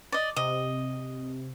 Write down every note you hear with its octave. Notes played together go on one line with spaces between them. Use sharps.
D5 D#5
C3 D#5